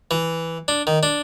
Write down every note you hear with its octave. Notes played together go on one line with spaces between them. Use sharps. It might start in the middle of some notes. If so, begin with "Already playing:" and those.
E3
D4
D#3
D4